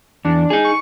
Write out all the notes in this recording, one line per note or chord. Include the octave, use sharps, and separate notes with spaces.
E2 D4
D#4 G#4
C#6